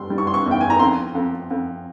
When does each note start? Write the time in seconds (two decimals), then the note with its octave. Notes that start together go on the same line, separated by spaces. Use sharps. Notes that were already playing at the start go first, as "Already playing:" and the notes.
Already playing: G3 C6
0.10 G3
0.18 C#6
0.27 C6
0.34 C#6
0.46 E2
0.51 G5
0.61 G#5
0.70 A#5
0.79 F2 C6
1.15 F2
1.50 F2